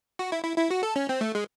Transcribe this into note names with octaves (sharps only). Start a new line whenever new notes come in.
F#4
E4
E4
E4
F#4
A4
C#4
C4
A3
G#3